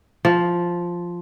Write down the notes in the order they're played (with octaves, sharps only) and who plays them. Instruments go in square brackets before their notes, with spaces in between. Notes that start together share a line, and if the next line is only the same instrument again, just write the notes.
[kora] F3